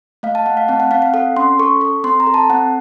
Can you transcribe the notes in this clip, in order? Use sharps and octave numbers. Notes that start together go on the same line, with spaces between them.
A3 F5
A5
A3 F#5
F5
C4 A5
F#5
C4 F5
F5
A4 F#5
C#4 C6
A4 C#6
A4
C4 C6
A#5
A4
A5
C4 F#5